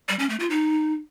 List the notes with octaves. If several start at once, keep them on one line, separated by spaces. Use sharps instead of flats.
G3
C#4
A3
F4
D#4